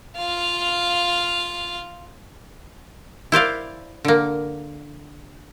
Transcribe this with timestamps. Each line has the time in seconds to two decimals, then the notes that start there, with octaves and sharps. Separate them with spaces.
0.17 F4 F5
3.32 E4 C5 D5 F5
4.05 D3 A#3